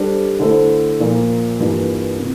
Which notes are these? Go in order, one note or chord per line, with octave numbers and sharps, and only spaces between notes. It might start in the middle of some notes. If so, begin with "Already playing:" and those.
Already playing: G3 D4 A4 C5
D3 A3 E4 A4 C5
A#2 F3 A#3 F4
G2 E3 A#3 D4 F4
C3